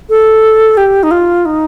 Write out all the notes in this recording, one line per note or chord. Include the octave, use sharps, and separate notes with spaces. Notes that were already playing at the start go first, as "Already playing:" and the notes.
A4
G4
D#4
F4
D#4